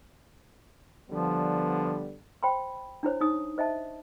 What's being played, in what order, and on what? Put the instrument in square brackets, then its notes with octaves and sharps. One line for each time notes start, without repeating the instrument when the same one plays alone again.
[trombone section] D3 G3 B3 [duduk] F3
[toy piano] C5 G5 B5 C6
D4 E4 C5 C#5
D#4 D#6
C5 D#5 E5 A5